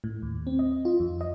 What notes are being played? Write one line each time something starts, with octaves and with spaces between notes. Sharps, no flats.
A2
D#2
C4
D#5
F4
F2
D#5